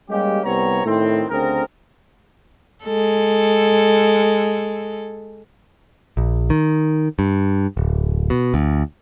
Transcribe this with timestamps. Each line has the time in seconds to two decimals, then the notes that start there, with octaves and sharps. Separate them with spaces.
0.10 G3 G#3 A#3 C#4 G4
0.45 C2 G3 B3 C4 C#5 A#5
0.85 A2 D#3 C4
1.30 D2 C#3 C4 G#4 A#4
2.84 G#3 A4
6.17 A#1
6.50 D#3
7.19 G2
7.77 D1
8.30 B2
8.54 D2